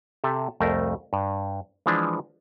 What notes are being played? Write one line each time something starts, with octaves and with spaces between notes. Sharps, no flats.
C3 G4 A4 E5 A5
C2 F2 A3 A#4 C5
G2
E3 F3 G#3 D4 B4 C5